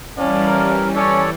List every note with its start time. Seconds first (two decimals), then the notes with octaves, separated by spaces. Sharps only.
0.17 E3 G3 C#4 D5 F5 A5
0.47 A#4
0.96 C#4 A4 C#5 D5